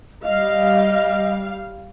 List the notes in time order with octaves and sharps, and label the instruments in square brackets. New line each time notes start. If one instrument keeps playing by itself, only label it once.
[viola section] G3 F5 [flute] D#5